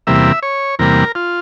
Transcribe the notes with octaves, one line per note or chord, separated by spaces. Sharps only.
E2 C3 G3 A#3 E5
C#5
E2 C3 G3 A#3 A#4
F4